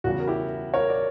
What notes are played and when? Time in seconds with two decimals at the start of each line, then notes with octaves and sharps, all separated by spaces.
0.04 E2 C#3 G3 F#4
0.19 A#4
0.27 E4 G4
0.73 A#4 C#5
0.90 D5